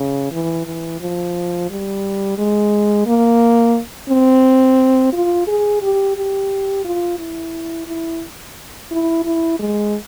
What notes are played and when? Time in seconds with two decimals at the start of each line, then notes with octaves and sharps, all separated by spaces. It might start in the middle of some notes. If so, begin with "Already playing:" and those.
Already playing: C#3
0.32 E3
0.66 E3
1.01 F3
1.70 G3
2.38 G#3
3.07 A#3
4.09 C4
5.13 F4
5.47 G#4
5.82 G4
6.16 G4
6.85 F4
7.19 E4
7.87 E4
8.91 E4
9.25 E4
9.59 G#3